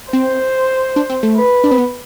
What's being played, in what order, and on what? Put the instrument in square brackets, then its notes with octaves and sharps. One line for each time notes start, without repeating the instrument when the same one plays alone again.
[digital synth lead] C4 [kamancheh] C5
[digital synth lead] D4
C4
A3
[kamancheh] B4
[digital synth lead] D4
C4
B3